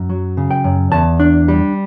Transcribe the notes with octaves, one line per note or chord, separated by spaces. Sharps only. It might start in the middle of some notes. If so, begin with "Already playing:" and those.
Already playing: F#2
F#3
C#3
G5
F#2
E2 A5
D4
G3